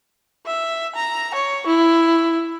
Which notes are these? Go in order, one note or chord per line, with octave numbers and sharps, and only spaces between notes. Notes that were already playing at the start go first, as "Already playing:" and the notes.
E5
A#5
C#5
E4